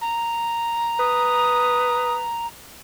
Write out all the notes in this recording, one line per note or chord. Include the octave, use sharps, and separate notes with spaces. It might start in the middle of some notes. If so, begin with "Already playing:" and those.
A#5
B4 D#6